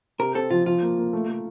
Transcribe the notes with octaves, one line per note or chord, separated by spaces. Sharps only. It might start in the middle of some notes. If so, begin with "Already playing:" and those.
C3 A#4
C4 A4
F3 F4
F3 F4
A#3
A#3
A3
A3